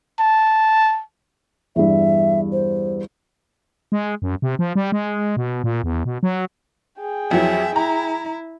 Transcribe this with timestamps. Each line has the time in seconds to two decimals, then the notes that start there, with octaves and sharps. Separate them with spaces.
0.19 A5
1.76 E2 G2 E5
2.52 C5
3.92 G#3
4.22 F#2
4.42 C3
4.59 F3
4.75 G3
4.92 G#3
5.37 B2
5.64 A#2
5.84 E2
6.05 B2
6.23 F#3
7.00 G#4 G5
7.31 F2 E3 F#3 E5
7.76 E4 A#5